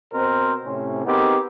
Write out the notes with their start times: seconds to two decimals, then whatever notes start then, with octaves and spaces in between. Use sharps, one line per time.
0.13 B2 C4 A#4 C5
0.65 A2 C3 C#4
1.06 B3 C4 D#4 G4 G#4 A#4